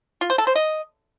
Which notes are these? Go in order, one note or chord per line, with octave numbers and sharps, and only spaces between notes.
F4
C5
A4
C5
D#5